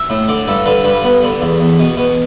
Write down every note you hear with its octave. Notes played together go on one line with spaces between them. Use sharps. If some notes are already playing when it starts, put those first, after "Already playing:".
Already playing: E5
A2
D3 D5
G2 A4
D3 B4
G2 B4
B3
D3
E2
E2
B2
B2